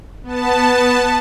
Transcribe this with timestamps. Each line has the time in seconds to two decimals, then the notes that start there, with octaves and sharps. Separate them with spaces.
0.23 B3 A5